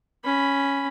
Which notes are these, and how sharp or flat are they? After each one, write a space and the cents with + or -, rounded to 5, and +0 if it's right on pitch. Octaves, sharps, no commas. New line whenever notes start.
C#4 +0 B5 +0